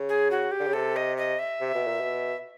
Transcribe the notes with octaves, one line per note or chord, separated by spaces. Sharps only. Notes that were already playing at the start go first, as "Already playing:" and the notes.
Already playing: C#3
G#4
F#4
G4
D3
C#3
C3 A4
D#5
D#5
E5
C3
B2
A#2
B2